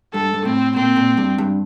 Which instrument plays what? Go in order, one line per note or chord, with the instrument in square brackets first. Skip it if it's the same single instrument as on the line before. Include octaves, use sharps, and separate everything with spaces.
[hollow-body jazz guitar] G2 [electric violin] A4
[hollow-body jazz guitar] G2
[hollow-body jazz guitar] A2 [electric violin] C4
[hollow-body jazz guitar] A#2 [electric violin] C4
[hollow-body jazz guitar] A#2
G2
G2